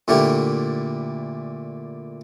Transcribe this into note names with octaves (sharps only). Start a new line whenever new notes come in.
A#2 D3 A3 D4 E4 G4